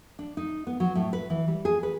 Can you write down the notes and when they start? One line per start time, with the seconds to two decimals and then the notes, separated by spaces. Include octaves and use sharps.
0.19 D4
0.37 D#4
0.67 B3
0.80 F#3
0.95 A2
1.13 B4
1.30 E3
1.48 G3
1.65 G#4
1.83 B4